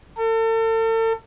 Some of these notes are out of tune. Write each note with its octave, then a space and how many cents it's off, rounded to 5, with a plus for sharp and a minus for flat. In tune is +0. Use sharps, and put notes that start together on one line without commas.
A4 +40